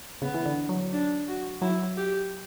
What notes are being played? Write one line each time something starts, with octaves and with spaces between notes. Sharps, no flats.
C#3 B3
E3
D3
F#3
D4
F#4
F#3 E4
G4